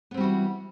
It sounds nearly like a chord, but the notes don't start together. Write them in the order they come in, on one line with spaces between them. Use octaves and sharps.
B3 C4 G3 F#4 E3